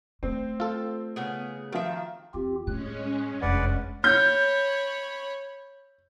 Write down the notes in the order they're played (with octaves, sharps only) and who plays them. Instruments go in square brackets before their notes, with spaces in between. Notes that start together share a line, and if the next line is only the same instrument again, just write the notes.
[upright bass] A3 [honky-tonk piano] C4
[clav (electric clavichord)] F4 A4
[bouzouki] C#3 B3 G#4
[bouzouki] D#3 E5 [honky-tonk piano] F3 F4 F#4
[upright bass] E2 [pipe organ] C4 F4 G4
[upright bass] A2 [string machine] G#3 C#4 [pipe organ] F#6
[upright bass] F1 D4 [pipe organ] F#2 [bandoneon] B4 D5 F#5
[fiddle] C#5 B5 [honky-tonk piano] G6